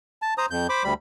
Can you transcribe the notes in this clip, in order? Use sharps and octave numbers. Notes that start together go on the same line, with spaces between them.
A5
C5 A#5 D#6
F2 G6
C5 B5 D6
D2 G3 B5